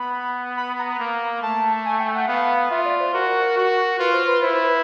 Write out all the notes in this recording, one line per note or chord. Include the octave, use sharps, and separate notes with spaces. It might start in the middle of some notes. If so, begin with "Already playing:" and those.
Already playing: B3 B5
B5
A#5
A#3
A3 A5
G#5
G5
F#5
B3 F5
F4 E5
D5
C5
F#4 A#4
F#4
F4 B4
C5
B4
E4 C5
C5
B4